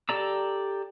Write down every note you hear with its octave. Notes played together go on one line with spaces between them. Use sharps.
G4 A4 D5 A#5 E6